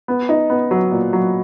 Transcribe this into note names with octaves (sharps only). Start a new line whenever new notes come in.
B3
D#4
B3
F#3
A#2
F#3